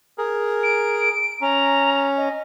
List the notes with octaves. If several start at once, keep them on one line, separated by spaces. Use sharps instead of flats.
G#4 A#4
D7
C#4 A#5
D#5